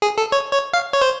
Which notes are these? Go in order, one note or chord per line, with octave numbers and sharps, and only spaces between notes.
G#4
A4
C#5
C#5
F5
C#5
C5